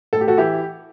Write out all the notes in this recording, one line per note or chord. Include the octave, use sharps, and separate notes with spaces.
A2 A4
G4
F#4 A4
E3 E4 G4